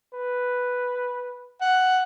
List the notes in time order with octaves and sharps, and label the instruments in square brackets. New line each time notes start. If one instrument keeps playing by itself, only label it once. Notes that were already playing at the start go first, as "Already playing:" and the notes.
[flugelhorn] B4
[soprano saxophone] F#5